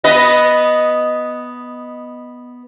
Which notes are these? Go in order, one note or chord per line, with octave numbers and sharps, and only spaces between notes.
B3 B4 D#5